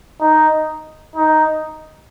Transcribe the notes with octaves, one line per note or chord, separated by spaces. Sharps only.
D#4
D#4